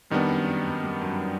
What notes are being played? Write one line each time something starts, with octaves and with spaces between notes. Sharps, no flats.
F2 D#3 G3 B3 D4
F#2
F#2
G2
G2
F#2
G2